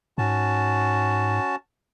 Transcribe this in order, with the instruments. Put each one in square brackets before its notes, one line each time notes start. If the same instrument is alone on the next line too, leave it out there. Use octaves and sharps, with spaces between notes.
[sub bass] G#2 [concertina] C#4 F#4 A5